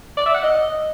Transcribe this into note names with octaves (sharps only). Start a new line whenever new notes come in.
D5
E5
F#5
D#5